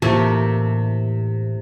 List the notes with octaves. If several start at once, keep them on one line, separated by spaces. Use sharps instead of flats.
A2 C3 E3 A3 A#3